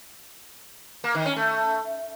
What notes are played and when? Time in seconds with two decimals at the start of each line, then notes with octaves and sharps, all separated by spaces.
1.04 A#3
1.15 D#3
1.26 C#4
1.36 A3